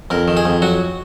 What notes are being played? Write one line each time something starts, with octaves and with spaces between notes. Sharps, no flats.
F2 A#4
D#3
G#4
F2
F#3 F#4